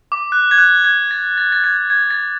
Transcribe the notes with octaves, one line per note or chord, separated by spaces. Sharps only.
D6
F#6
G#6
F#6
G#6
A6
A6
A6
G#6
G#6
A6